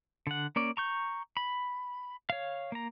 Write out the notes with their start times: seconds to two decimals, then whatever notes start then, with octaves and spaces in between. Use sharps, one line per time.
0.27 D3 F#5
0.56 A#3 C#4 D5
0.77 A#5 C#6 G6
1.37 B5
2.30 C#5 F5
2.72 A#3 A#5